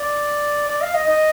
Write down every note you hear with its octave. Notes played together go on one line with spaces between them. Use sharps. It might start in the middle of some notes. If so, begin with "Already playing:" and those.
Already playing: D5
D5
F5
D#5
D#5